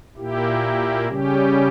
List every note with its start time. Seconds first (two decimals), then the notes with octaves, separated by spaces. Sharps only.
0.17 A#2 A#3 E4 G4
1.08 C#3 G3 C#4 G4